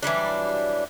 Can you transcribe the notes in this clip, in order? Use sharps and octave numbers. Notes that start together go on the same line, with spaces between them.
E3 F#3 G3 D4